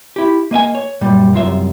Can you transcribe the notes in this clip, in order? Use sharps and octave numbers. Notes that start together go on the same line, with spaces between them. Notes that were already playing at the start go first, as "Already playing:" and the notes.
E4 G4
A#3 D#5 E5 G#5
C#5
F#2 A#2 G3
C2 F#2 F4 E5